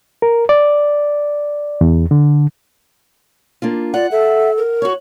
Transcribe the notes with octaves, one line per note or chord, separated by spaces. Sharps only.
A#4
D5
E2
D3
A#3 D4 F4
F4 D5 F#5
A4 E5
A#4
F#4 C#5 C#6